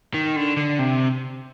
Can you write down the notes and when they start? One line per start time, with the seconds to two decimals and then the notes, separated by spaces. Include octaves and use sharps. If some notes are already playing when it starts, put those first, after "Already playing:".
0.14 D#3
0.36 D3
0.57 D3
0.79 C3